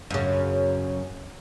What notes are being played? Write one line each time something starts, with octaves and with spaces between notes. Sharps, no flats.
F#2 C#3